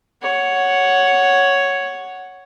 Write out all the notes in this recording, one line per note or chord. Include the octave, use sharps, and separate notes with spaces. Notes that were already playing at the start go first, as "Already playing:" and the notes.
C#5 F#5